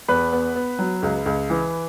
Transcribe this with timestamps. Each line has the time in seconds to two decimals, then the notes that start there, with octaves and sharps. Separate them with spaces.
0.08 E2 B4 B5
0.33 B3
0.55 B3
0.79 F#3
1.03 C#2
1.26 C#2
1.50 E3